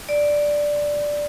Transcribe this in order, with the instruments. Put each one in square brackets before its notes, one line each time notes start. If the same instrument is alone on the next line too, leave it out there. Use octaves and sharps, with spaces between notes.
[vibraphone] D5